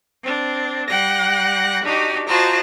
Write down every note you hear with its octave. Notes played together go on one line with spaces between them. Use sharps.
C4 D4
G3 F#5 G5 A#6
D4 D#4 F#4 G4
F4 F#4 C5 D#5 A5 A#5